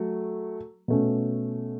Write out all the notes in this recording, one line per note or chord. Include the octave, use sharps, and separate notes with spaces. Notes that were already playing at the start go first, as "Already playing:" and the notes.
Already playing: F#3 A3
B2 A3 C#4